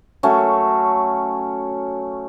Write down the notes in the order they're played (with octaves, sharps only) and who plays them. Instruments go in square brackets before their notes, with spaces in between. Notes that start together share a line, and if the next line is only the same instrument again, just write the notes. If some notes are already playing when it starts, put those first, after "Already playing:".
[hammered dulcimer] F#3 A3 C#4